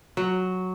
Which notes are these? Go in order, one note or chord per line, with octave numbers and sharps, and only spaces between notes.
F#3